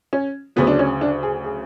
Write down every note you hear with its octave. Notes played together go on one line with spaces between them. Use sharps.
C#4
D2 C#3 F#3 B3
D4
C#4
D4
G#4
G#4